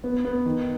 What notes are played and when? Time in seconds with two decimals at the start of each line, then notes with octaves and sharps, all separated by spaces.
0.04 B3
0.25 B3
0.46 D#3